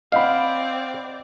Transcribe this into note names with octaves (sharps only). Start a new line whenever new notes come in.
C4 D5 D#5 F5 F#5 B5